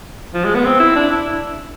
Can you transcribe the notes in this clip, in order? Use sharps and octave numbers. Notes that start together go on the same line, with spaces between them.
F3
G#3
B3
C4
E4
D4
E4